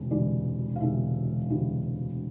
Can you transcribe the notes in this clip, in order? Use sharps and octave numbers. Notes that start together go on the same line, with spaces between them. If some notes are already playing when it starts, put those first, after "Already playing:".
Already playing: E1 D2 C3 E3 G#3
E1 D2 C3 E3 G#3 D5
F5
E1 D2 C3 E3 G#3 E5
E1 D2 C3 E3 G#3